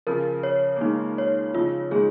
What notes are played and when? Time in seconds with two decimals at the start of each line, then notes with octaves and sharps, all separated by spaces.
0.07 C#3 F3 A#4
0.43 C#5
0.76 A#3
0.80 D#3 G#3 D#4
1.18 C#5
1.54 C#3 F3 F4
1.91 D#3 G#3 G#4